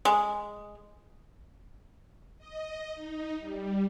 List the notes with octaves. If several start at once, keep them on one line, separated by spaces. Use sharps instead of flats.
G#3
D#5
D#4
G3